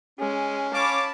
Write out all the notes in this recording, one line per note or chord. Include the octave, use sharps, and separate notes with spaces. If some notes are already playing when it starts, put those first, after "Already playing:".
G#3 C#4
C#5 F5 A5 B5 D6